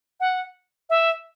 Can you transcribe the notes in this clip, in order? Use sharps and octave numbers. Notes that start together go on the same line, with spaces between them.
F#5
E5